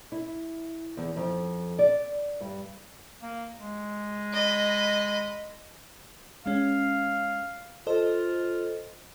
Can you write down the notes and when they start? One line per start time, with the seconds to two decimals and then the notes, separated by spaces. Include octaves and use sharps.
0.12 E4
0.97 E2
1.16 F2
1.79 D5
2.41 G2
3.22 A#3
3.58 G#3
4.33 D#5 B5
6.46 G#3 C#4 F5
7.87 F4 A4 C5 D#5